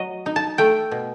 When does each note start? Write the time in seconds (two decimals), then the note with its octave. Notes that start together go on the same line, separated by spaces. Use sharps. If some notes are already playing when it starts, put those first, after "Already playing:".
Already playing: F#3 D#5
0.26 D#4
0.36 A5
0.58 A3 G5
0.91 B2